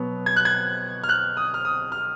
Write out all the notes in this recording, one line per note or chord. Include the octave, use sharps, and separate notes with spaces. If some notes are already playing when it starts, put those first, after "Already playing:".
Already playing: B2 F#3 B3
G#6
F#6
G#6
F6
F#6
D#6
F6
D#6
F6